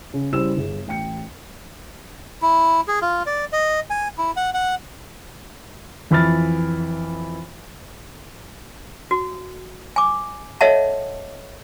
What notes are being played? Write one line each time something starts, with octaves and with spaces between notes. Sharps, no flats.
C#3
C#3 G3 E4 C5 E6 E7
G1 G#4
A1 G5 C#7
E4
G#4
F4
D5
D#5
G#5
E4
F#5
F#5
F2 E3 B5 F6 A6
F#4
G#5 D6
A4 C#5 D#5 E5 F#5 A5